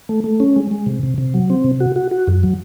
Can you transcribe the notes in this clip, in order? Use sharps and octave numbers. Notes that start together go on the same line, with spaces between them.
A3
A3
C#4
G#3
G#3
C3
C3
C3
F#3
C4
C3
F#4
F#4
F#4
F#2
F#3